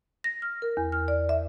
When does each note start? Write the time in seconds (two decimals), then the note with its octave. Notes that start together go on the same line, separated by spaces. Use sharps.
0.24 A#6
0.42 F6
0.62 A#4
0.77 E2
0.92 F6
1.08 D5
1.29 E5